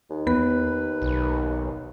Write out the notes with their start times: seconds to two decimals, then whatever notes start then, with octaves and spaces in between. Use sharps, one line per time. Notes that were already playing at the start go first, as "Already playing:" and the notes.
0.10 D#2
0.27 E2 B3 B4 B5
1.02 B1